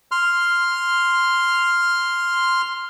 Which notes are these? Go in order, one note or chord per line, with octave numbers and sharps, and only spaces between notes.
C6 F6